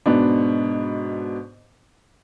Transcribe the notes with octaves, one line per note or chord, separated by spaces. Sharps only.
G#2 B2 B3 D4